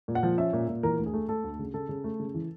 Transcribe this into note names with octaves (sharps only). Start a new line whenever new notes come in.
A#2
F#5
F3
C#4 E5
A#2
A#2
E3 A#4
D2
G#4
A3
A3 A4
D2
C#3
C#3 A4
C#3
A3
C#3
E3